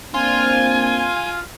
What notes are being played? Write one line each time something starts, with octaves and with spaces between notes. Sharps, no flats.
A#3 C4 D4 F4 G#5